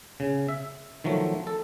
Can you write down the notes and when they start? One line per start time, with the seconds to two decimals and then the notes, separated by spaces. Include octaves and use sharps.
0.20 C#3
0.49 E5
1.04 D#3 F3 F#3 A3
1.47 A4